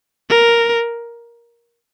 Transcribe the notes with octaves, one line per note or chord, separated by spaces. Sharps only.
A#4